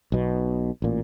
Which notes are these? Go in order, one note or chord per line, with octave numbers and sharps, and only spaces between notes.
B1 B2
A1 A#2